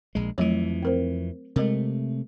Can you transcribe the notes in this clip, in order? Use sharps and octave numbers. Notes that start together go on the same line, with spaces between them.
A#1 G#3
F2 E3 F#3 A3
C4 A#4 C5
C3 G#3 A3 A#4